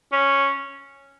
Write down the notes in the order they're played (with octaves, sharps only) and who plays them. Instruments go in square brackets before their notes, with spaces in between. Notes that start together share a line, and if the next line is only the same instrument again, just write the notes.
[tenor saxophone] C#4